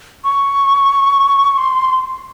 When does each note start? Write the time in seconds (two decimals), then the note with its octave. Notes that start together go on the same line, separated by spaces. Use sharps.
0.24 C#6
1.58 C6